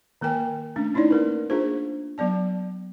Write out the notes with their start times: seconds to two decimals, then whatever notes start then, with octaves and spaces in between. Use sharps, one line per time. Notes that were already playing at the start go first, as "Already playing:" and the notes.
0.21 D#3 A#3 A#4 G5 G#5
0.76 A3 C#4 D4
0.94 C#4 D#4 E4 C#5 D5
1.11 A#3 A#4 B4
1.50 A#3 D4 F4 G#4 C5
2.18 F#3 B3 D5 A5